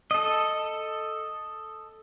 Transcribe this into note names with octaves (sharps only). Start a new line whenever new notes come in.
A4 D#5